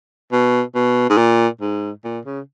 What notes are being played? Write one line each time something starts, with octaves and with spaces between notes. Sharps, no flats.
B2
B2
G#2
A#2
G#2
A#2
C#3